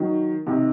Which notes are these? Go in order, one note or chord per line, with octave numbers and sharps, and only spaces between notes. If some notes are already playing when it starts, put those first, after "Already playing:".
Already playing: D#3 F#3
C3 D#3